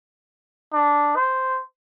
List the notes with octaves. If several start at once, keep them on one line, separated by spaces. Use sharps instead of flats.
D4
C5